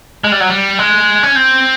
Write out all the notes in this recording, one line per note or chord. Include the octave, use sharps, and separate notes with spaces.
G#3
G3
F#3
G3
G#3
C#4
C4